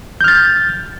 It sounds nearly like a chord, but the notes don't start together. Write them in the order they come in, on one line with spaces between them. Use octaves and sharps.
G6 F6 A6